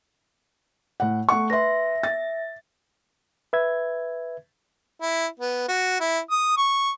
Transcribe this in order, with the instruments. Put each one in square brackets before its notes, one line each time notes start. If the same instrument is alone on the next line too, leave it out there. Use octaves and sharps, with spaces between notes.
[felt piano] A2 F#5
A3 F#5 C#6
[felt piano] B4 C6 [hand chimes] E5 A#6
[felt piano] A6
[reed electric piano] B4 E5 G#6
[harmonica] E4
B3
F#4
E4
D#6
C#6